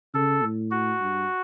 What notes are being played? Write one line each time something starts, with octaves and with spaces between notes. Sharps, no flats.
C#3 A4
A2
F#4
G2